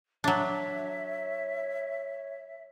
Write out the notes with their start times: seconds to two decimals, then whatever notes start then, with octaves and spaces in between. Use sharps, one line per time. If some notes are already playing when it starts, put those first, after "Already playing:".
0.24 F#3 D4 C#5 E5